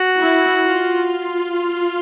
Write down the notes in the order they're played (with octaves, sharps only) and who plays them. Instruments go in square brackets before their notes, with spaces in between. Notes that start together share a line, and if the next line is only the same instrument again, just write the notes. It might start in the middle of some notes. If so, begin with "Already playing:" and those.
Already playing: [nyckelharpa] F#4
[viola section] E4
F4